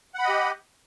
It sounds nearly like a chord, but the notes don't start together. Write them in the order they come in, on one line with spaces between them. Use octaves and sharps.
F#5 B5 D#5 G4